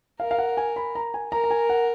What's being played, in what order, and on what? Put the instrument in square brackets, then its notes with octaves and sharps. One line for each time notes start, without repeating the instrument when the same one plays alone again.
[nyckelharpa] A#4 [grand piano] F5
[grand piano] F5
F#5
G#5
B5
A#5
G#5
[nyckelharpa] A#4 [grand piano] A#5
[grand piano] A#5
G#5
F#5